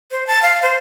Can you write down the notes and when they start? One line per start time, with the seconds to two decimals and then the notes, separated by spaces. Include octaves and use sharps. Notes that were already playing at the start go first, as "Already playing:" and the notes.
0.11 C5
0.27 A5
0.42 F5
0.62 C5